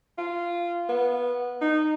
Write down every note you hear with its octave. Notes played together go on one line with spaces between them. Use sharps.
F4
B3
D#4